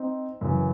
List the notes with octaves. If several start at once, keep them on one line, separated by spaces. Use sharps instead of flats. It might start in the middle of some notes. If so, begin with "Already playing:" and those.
Already playing: C4 D#4
F#2 C#3 E3